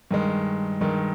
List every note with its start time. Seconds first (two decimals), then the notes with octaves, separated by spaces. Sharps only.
0.11 G2 D#3 G#3
0.81 G2 D#3 G#3